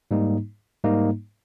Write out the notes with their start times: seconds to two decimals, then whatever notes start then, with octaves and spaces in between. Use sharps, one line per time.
0.11 G#2 G3 A#3 D#4
0.84 G#2 G3 A#3 D#4